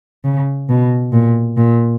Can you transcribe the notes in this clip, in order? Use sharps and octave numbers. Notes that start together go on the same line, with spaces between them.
C#3
B2
A#2
A#2